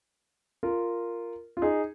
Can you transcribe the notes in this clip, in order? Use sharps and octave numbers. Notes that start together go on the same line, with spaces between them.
F4 A#4
F4
D#4 G#4